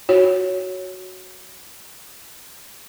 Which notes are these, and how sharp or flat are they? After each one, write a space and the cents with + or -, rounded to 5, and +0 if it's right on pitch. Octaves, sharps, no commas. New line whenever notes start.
F#4 +0 C#5 +0